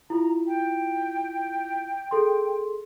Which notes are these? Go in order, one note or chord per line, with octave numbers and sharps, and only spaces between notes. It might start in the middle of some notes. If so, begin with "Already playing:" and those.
E4 F4 A#5
G5
G#4 A4 C6